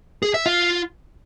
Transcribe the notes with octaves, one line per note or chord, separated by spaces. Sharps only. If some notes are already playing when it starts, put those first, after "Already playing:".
G#4
E5
F4